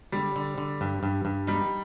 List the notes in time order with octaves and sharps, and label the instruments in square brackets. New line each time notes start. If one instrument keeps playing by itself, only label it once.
[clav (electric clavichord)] D3 [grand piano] G3
[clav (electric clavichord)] D3
D3
G2
G2
G2
[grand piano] G3 [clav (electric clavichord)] D#4